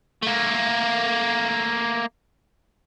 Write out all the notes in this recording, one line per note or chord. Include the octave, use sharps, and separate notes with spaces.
A3 A#3